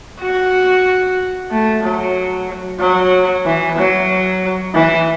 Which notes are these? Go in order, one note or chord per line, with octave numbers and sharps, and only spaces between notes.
F#4
A3
F#3
F#3
E3
F#3
E3